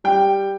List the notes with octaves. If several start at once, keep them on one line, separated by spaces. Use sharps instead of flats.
G3 G5